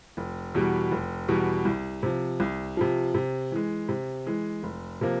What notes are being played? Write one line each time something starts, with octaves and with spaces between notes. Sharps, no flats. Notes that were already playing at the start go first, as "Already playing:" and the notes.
F1
E2 B2 G3
F1
E2 B2 G3
C2
C3 F3
C2
C3 F3
C3
E3 G#3
C3
E3 G#3
F1
C3 F3 A#3